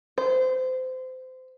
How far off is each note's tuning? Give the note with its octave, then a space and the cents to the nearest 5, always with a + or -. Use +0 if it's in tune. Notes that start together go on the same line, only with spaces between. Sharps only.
C5 -25